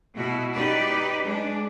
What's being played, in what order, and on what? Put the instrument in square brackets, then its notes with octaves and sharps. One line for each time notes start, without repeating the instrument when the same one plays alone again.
[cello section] B2 E4 F#4
D#4 G4 B4 D5
G#3 D4